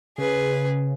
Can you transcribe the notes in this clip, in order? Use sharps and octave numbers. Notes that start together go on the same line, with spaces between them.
C#3 G#4 B4